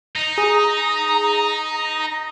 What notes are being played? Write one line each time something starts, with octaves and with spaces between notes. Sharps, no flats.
D#4 A#5
G#4 D#6